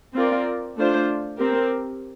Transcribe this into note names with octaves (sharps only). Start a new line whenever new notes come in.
C4 F4 A#4 D5
A3 D4 F4 C5
C4 G4 A#4